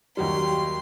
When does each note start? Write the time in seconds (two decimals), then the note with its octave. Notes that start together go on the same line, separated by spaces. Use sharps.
0.17 D#2 F#3 G3 C6